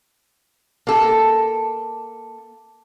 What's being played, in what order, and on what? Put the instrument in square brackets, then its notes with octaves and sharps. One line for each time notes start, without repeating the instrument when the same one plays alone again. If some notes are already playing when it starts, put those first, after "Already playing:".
[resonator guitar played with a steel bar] A#3 A4